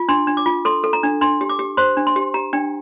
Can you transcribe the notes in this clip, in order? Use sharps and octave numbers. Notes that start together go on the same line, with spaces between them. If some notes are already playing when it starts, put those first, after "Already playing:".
Already playing: F4
D4 C6
D4
D6
F4
A4 C6
A4
A#5
D4
D4 C6
G4
D6
G4
C5 C6
D4
C6
G4
G4 A#5
D4 G5